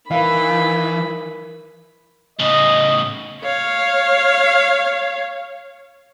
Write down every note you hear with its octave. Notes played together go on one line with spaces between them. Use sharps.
D#3 E3 B4 F5 B5
A2 C#3 D#5
C#5 F5